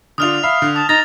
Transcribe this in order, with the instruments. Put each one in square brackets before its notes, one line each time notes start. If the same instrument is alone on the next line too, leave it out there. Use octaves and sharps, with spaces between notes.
[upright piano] D3 D4 F4 [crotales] D#6 F6 F7
[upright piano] E5 B5 [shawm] F5
[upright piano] D3
[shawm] A5 [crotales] D#6
[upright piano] D#4 [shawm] A#5 [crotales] A6